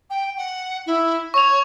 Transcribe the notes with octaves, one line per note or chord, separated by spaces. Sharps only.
G5
F#5
E4
C#5 C#6 F7